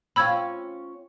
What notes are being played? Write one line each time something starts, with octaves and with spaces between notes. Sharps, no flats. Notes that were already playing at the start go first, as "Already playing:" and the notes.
C4 C#4 F4 B5 E6 G#6